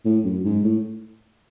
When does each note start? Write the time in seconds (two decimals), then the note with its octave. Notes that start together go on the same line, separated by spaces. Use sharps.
0.05 A2
0.24 F#2
0.44 G#2
0.63 A2